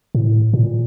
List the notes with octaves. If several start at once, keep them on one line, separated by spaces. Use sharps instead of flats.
A2
A#2